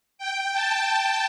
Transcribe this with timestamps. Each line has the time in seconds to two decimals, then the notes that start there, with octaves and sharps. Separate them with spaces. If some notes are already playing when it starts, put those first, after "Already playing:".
0.18 G5
0.53 A5